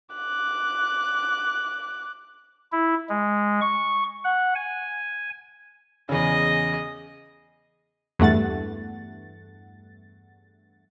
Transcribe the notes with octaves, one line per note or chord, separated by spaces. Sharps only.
D6 F#6
E4
G#3
C#6
F#5
G#5
E2 C#3 G#4 D#5
E2 G2 A3 F#5 A6